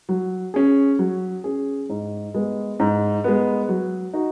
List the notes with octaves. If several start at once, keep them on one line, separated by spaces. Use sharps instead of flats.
F#3
C#4 G#4
F#3
C#4 G#4
G#2
G#3 B3
G#2
G#3 B3
F#3
D#4 F#4